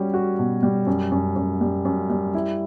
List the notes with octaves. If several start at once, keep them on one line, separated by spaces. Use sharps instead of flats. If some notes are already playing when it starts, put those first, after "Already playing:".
Already playing: G3 C#4 F#4
F#4
B2
G3
F#2
F#2
F#2
G3
F#2
G3
E4